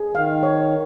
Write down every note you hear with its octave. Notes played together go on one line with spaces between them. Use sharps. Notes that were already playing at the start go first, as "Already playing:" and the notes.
Already playing: G#4
D#3 F5
C#5